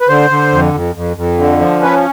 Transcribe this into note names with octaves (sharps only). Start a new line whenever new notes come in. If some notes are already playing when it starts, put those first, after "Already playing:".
B4
D3 C5
D3
F2
F2
F2
F2
D3
F3
C#4 B4